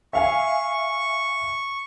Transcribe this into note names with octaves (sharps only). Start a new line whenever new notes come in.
E5 F5 G#5 C#6